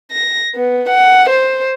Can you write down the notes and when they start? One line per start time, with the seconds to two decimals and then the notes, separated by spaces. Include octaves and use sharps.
0.12 A#6
0.55 B3
0.89 F#5
1.29 C5